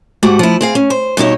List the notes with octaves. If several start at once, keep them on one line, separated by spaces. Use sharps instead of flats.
G#2 A3 F#4 G4 F#5
F3 E4
C4 G#4 F5
C#4
C5
G2 B2 D#4 E4 C#5